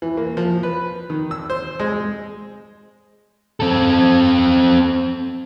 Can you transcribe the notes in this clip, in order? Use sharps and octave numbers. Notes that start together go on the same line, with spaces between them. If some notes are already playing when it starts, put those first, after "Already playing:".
E3
A#3
F3
B4
D#3
E6
C5
G#3
C4 A4